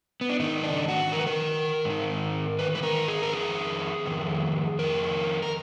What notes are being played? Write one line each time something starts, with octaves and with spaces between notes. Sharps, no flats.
B3
D4
G#2 D#3 D#4
D4
F#4
G#2 A#4
D#3 B4
A#4
G#2 D#3
G#2 D#3 B4
B4
A#4
G#4
A#4
F2 D#3 G#4
F2 D#3
F2 D#3 A#4
A#4